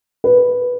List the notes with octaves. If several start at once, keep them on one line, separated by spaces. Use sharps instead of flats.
B4